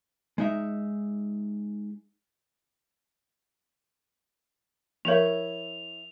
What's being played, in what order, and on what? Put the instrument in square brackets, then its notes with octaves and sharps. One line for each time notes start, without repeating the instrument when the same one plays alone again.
[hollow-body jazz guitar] G#3 D#4 E5
[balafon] F3 A#4 [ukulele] E4 C#5 E5 [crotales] F7